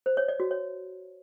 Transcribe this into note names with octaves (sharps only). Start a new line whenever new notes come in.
C5
C#5
D5
F#4
C#5